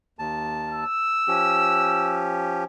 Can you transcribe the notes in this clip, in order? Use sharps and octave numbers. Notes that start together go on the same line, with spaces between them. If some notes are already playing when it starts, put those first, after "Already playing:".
D#2 A5
E6
F3 C#4 G4